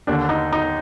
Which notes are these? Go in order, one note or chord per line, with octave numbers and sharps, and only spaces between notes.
D#2 D3 D4
D#4
D#4